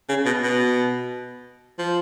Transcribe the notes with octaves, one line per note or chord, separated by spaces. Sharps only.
C#3
B2
B2
F3